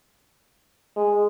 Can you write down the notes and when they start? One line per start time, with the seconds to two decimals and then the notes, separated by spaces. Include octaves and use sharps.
0.96 G#3